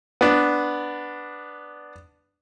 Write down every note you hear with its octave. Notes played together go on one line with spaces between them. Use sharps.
B3 D4